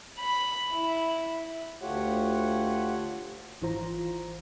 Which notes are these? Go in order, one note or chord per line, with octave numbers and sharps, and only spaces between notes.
B5
E4
D2 A3 F4 G4 C#5 F#5
G#1 E3 F4 C5 A#5